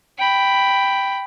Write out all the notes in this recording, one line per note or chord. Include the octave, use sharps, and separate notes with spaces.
G5 B5